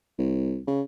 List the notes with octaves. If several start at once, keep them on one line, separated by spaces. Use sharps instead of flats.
C2
C#3